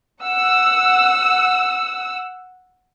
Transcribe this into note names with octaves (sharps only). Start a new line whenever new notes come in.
F#5 E6